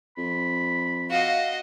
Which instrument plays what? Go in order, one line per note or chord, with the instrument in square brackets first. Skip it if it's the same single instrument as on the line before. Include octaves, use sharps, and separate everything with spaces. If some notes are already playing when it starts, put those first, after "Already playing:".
[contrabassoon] F2 [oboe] B5
[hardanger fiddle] F#4 D#5 [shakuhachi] F5